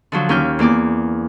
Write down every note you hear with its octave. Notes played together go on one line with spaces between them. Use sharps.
D3 F3 F#3
D#2 C#4 F6 G6
E2 A#3 D5 D6